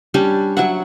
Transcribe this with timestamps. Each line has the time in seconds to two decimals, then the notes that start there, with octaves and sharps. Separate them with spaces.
0.14 G3 C#4 D4 G4
0.57 F#3 E5 F#5